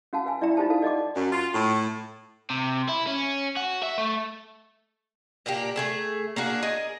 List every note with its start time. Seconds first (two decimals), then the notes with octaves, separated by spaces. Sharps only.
0.13 C#4 F#4 F5 F#5 A5
0.26 B4 F5 G#5
0.41 E4 D5 E5 G5 A#5
0.57 D#4 F4 G4 C5 A5
0.70 A4 F5 A5
0.82 D5 D#5 F#5 D6
1.16 F#2
1.32 F4
1.54 A2
2.50 C3
2.88 E4
3.07 C#4
3.56 F#4
3.83 E5
3.98 A3
5.46 A#2 A#3 D4 G4
5.76 A3 G#4 A4
6.36 A#3 D4 F#4 G#4
6.63 G#4 A#4 D#5